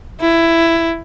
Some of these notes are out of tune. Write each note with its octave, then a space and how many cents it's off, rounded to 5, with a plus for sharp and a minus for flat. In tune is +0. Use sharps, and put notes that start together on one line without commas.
E4 +10